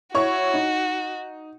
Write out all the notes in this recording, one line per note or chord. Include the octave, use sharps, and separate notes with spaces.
E4 F#4 C#5 C#6
D#4